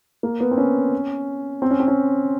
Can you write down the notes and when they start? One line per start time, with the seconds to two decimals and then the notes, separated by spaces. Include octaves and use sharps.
0.23 A#3
0.40 B3
0.51 C4
0.57 C#4
1.62 C4
1.71 C#4
1.80 C4
1.88 C#4